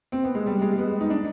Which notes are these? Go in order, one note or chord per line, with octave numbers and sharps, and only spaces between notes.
C4
B3
G#3
G3
G#3
G#3
B3
D#4
D4